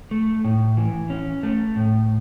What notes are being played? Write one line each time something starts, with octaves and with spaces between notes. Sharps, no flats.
A3
A2
E3
C#4
A3
A2